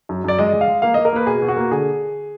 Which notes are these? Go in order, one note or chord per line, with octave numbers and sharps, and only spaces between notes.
F#2
F#2 D5
G#3 D#5
G#3
F5
G#3
A#3 F5
A#3 D#5
A#4
A#3 B4
B2 G#4
B2
F#4
A#3
D3 G#4